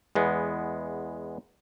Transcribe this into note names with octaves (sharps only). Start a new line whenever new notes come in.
E2 G#3 B3